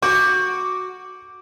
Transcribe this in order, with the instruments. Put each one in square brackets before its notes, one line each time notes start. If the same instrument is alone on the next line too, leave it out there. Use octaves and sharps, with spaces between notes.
[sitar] F#4 [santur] D6 [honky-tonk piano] G6